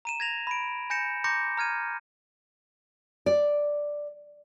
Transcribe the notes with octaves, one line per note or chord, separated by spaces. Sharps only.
A#5 D#7 E7
G#6 A#6 F7
B5 D7
G#5 G6 A#6 C#7 E7
A#5 C6 D6 G6 A#6 C#7
A#5 F6 G#6 D#7
D5